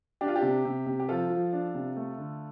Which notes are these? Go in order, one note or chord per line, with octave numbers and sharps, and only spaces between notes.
D4 G4
F4
G4
C3
C3
C3
G4
F3 F4 A4
F3
D4
C3
A3
D3